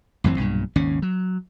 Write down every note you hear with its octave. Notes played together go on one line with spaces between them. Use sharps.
A1 F#2 E3 C4
B1 G2 A#2
G#1 D#2 C#3 C#4
F#3